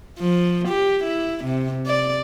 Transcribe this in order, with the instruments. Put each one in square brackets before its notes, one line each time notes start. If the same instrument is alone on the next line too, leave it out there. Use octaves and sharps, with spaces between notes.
[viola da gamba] F3
G4
E4
C3
D5